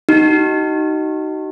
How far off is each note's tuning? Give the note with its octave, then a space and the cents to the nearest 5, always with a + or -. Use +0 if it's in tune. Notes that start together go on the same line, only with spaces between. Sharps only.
D#4 +0 F#4 +40